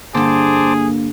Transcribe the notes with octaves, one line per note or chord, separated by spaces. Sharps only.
G2 D3 A#3 G#4 C5 A5 D6